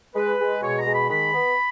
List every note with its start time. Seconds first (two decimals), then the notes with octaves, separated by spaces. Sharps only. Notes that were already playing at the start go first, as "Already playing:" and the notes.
0.15 G#3 B4
0.40 G#3
0.62 B2 C#5
0.78 A#5
0.86 G#3
0.94 B5
1.10 D#3 B5
1.34 B3